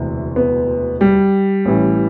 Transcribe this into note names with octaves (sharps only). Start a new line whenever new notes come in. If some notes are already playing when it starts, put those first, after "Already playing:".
Already playing: E1 D2 C3 E3
B3
G3
A1 A2 E3